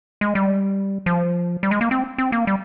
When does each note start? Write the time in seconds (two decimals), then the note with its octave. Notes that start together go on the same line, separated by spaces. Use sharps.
0.21 G#3
0.35 G3
1.06 F3
1.63 G3
1.71 G#3
1.81 A#3
1.91 C4
2.18 C4
2.32 A#3
2.47 G3